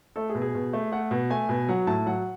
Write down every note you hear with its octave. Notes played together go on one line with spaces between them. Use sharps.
A3 A4
G#4
B2
G#4
B2
A3
A3 F#5
B2
A3 G#5
B2
F#3 F#5
A2 A5
F#3 F#5